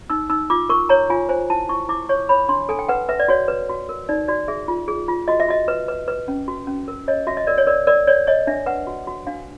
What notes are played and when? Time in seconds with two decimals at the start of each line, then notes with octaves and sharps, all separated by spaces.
0.10 D#4 E6
0.29 D#4 E6
0.50 F4 D6
0.69 A#4 C#6
0.89 C#5 A#5
1.10 F4 G#5
1.29 C5 G#5
1.50 E4 A5
1.69 E4 C#6
1.89 E4 D6
2.09 C#5 C#6
2.29 C#5 B5
2.49 D4 C6
2.69 A4 G#5
2.79 G5
2.88 B4 F#5
3.09 B4 E5
3.19 D5
3.28 F#4 C#5
3.48 B4
3.69 F#4
3.89 A#4
4.09 D#4 D5
4.28 F#4 D5
4.48 G#4 E5
4.68 F4
4.88 G#4
5.08 F4
5.28 F#4 D#5
5.40 E5
5.48 F#4 D#5
5.68 B4
5.88 B4
6.08 B4
6.28 C#4
6.48 F#4
6.67 C#4
6.88 A#4
7.08 C#5 D#5
7.27 F#4 E5
7.37 D#5
7.47 A#4 D5
7.58 C#5
7.67 A#4 D5
7.87 A#4 D5
8.07 C#5 D5
8.27 C#5 D#5
8.47 D4 E5
8.66 B4 F#5
8.87 F#4
9.07 F#4
9.27 D4 F5